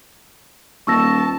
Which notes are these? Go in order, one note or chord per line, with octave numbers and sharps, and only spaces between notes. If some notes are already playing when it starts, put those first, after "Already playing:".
D#1 A5 C#6 E6 A#6